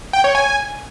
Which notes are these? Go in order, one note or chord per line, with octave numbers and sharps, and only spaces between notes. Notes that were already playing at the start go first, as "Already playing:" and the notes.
G5
C#5
G#5